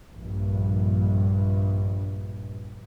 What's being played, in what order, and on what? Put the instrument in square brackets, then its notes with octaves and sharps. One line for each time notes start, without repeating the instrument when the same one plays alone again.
[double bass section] A#1 G2